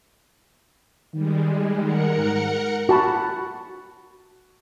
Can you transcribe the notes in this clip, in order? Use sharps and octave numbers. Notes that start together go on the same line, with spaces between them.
D#3 G3 G#3
D#3 A#4 F#5 C#7
G#2
F#4 A5 B5